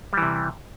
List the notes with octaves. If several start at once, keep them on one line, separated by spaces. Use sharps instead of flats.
C3 E3 G3